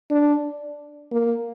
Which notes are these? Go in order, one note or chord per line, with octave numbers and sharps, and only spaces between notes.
D4
A#3